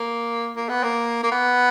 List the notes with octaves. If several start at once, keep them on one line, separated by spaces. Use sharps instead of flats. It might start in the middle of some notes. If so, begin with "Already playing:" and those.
Already playing: A#3
A#3
B3
A#3
A#3
B3